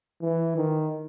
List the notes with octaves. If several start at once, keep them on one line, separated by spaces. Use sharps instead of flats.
E3
D#3